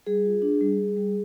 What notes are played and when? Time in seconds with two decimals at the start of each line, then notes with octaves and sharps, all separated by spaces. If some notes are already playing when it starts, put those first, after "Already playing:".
0.07 G3 G#4
0.25 F4
0.42 D4
0.61 G3
0.79 G3
0.97 G3